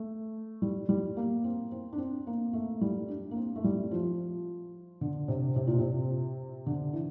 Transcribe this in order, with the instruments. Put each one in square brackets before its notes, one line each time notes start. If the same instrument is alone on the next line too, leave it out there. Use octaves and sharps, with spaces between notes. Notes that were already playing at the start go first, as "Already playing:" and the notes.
Already playing: [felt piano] A3
G3
G3
A#3
C4
C4
D4
C4
A#3
A3
G3
D4
A#3
C4
A3
G3
F3
D3
C3
C3
A#2
C3
D3
E3